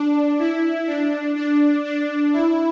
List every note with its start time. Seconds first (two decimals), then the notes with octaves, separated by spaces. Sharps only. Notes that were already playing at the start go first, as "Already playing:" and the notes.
Already playing: D4
0.39 E4
0.87 D4
1.36 D4
1.84 D4
2.33 E4